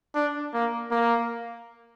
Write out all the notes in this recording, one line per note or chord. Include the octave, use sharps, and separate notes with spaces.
D4
A#3
A#3